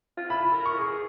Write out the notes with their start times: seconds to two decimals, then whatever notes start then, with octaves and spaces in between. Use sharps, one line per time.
0.17 F4
0.29 E4 B5
0.53 A#4
0.66 C#6
0.78 G#4